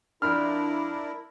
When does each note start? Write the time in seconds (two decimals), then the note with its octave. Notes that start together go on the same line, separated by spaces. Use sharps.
0.22 F2 D4 E4 A#4 B5 F6